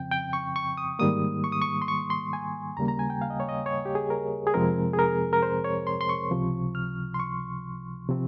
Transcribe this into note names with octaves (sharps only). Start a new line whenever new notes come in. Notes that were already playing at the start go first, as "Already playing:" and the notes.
Already playing: F2 C#3 F3 C4 G5
G5
C#6
C#6
D#6
G#2 D#3 G3 A#3 D#6
C#6
D#6
C#6
C6
C#6
C6
G#5
D#2 C#3 G3 A#3 A#5
A#5
G#5
G5
F5
D#5
C#5
D#5
C#5
G4
G#4
A#4
G#4
F2 C3 F3 G#3 C4 A#4
G#4
A#4
A#4
C5
C#5
C6
C6
C#6
C#2 C3 F3
F6
C6
C#6
C3 F3 C4